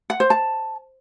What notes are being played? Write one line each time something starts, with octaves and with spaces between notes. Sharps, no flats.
F#5
C5
A5